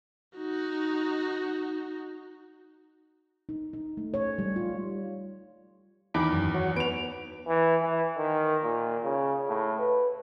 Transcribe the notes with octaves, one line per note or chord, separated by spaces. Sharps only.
D#4 F#4
D#4
D#4
A3
C#5
G3
F4
E2 D#3 B5 D6
F#2
F#4 C#5
B3 B4 D7 F7
E3
E3
D#3
A#2
C#3
A2
B4